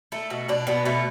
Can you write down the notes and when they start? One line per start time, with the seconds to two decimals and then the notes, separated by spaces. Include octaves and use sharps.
0.12 A3 A4
0.30 B2 F#4
0.49 B2 D4
0.67 B2 B3
0.85 B2 A3